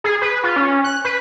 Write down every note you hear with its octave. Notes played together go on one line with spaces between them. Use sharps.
G#4
B4
F4
C#4
F#6
B4